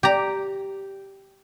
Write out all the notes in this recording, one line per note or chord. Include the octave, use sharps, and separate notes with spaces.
G4 A#5